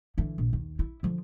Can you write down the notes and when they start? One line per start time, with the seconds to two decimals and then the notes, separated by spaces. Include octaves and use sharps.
0.18 D3 E3
0.38 A#1
0.53 D#2
0.79 E4
1.03 D3 F3